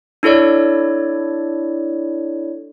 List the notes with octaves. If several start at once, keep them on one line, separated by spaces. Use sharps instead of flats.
D4 E4 A4 C#5 D5